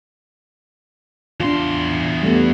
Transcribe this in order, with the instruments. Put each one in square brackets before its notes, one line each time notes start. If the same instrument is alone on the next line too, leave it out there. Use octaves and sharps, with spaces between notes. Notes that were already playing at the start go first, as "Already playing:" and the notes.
[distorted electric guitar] E2 C6 [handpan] D4 F4
[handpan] G3 A3 B3